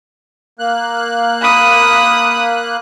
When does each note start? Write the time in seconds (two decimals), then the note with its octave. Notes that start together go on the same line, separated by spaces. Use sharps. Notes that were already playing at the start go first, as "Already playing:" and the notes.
0.59 A#3 F#6
1.42 B5 D#6